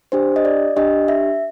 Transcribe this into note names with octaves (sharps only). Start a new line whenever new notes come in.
D4 G4 C5
D#5
D5
D4 G4 D#5
E5